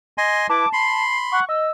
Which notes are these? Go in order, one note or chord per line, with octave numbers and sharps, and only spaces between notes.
D#5 G#5 C6
E4 B4 A5 D6
B5 C6 C7
F#5 C#6
D#5 E6